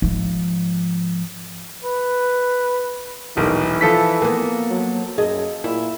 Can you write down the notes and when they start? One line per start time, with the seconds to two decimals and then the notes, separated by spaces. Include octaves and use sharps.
0.02 G#2 F3
1.84 B4
3.37 D#1 B1 E3 A#4
3.81 F3 A4 B6
4.22 A#3 B3
4.70 F#3
5.18 F#2 G#4 D#5
5.64 A#2 E4